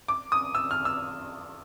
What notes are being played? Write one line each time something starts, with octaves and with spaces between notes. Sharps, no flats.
D6
D#6
E6
F6
E6